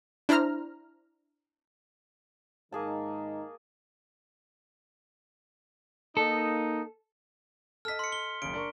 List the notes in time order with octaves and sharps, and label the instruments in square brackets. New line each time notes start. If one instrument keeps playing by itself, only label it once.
[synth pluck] D4 E4 C5 A#5 F6
[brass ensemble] G#2 D#3 D#4 [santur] A#3 G#4 A5
[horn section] A#3 D#4 [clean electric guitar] A4
[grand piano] A4 D#5 [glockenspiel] F6 B6
[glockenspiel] C6 C#7
G7
[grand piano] F#1 C#3 [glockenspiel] D7
[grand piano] D4 A#4 C#6